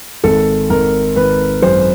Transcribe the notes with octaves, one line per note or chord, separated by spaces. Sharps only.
G#1 A4
G#1 A#4
G#1 B4
F#2 C5